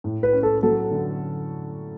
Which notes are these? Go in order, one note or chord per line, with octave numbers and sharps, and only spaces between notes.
A2
B4
C#4
A4
F#3 A4
D3